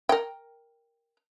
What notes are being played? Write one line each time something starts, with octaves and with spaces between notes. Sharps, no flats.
A#4 G5